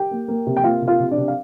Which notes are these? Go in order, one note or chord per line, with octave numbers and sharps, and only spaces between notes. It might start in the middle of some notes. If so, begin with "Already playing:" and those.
Already playing: G4 G5
A#3
A#3
C3
G5
A#3 F4 F5
C3
F4 F5
C3
D4 D5
C3
F5